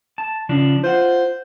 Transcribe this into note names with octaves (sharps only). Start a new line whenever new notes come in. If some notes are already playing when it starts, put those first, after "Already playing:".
A5
C#3 F3 D4
F4 C5 F#5